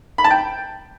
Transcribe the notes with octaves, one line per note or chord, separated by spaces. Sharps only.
B5
A5
G5